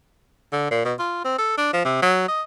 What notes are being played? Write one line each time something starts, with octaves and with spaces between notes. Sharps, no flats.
D3
A#2
B2
F4
C4
A4
D4
F3
C3
F#3
D#5